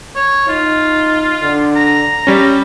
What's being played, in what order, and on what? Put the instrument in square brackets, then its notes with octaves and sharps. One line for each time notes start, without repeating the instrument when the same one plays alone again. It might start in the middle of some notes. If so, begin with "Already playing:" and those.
[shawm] C#5
[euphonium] D#4 [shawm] F4
[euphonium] D3
[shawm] A#5
[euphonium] A2 [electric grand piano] G3 C#4